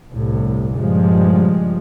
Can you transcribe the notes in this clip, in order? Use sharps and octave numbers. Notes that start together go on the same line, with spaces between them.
G1 C2 A2
G2 A#2 C#3 F3 G3 G#3